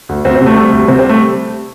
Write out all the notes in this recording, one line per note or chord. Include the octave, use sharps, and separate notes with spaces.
D2
D2 C4
C4
C3
A3
G3 A3
D2
C3 C4
C4
G3
A3